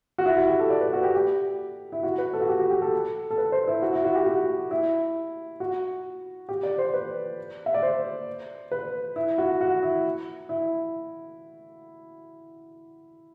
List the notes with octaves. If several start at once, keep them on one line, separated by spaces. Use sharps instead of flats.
F#4
E4
F#4
G4
A4
D5
B4
F#4
G4
G4
E4
F#4
B4
A4
F#4
G4
F#4
G4
A4
A4
B4
C5
E4
F#4
E4
F#4
G4
F#4
E4
F#4
G4
D5
C5
B4
E5
D5
C5
B4
E4
F#4
F#4
E4
E4